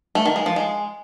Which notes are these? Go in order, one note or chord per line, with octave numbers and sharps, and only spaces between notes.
A3
D#3
G#3
F3
G#3